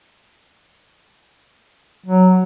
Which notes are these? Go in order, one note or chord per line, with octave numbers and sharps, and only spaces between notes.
F#3